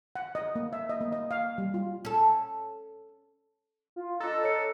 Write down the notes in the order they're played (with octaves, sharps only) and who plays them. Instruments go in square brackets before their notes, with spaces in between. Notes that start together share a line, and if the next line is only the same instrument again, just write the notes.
[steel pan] F#5
D#5
A#3
E5
D#5
A#3
D#5
F5
G3
F4
[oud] C#4 A4
[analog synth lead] F4
[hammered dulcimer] D4 D#5 [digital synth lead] A4 [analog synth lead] A#5
[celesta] C#5 C#7